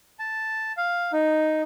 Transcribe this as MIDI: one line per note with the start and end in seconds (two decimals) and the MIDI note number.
0.19 0.72 81
0.77 1.12 77
1.13 1.62 63